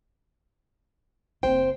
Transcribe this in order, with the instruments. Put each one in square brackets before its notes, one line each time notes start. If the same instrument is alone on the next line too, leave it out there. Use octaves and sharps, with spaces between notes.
[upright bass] F#1 C4 [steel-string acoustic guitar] C5 G5